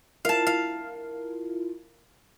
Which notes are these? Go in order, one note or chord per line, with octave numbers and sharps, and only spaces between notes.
E4 F4 A#4 F5 A5
F5